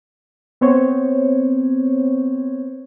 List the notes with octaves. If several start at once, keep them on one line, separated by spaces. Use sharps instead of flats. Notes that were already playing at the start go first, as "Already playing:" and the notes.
B3 C4 C5 C#5